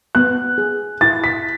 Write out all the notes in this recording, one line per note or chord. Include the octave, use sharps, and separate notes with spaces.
B3 F#6
G#4
E4 A6
B6